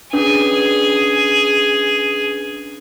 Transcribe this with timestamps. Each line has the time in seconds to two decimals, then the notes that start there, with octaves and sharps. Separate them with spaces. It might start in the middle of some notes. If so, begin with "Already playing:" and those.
0.13 C#4 D4 G#4 B4